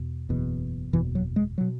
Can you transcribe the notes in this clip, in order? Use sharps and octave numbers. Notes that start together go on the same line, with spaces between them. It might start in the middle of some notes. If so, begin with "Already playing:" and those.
Already playing: E2 B2
F#1 E2 B2
F#1 E2 B2 E3
F#3
G#3
B2 F#3